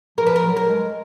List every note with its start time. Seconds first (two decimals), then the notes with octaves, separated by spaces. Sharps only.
0.18 F3 A#4
0.27 B4
0.36 A#4
0.44 F#3
0.57 A#4
0.69 G#3